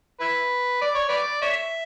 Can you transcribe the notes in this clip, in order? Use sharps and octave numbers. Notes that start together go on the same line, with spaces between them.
E4 B4
D5
C#5
B4 D5
C#5 E5